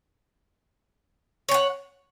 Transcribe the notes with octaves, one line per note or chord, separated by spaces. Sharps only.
C#5 F#5 G5